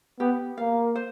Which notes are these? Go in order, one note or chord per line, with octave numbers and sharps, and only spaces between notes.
B3 G4
A#3 F5
C5